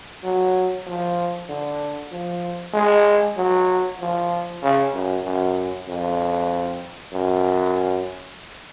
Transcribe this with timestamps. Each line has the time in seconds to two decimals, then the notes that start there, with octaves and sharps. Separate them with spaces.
0.24 F#3
0.86 F3
1.49 D3
2.11 F3
2.74 G#3
3.37 F#3
4.00 F3
4.62 C#3
4.94 F#2
5.25 F#2
5.88 F2
7.13 F#2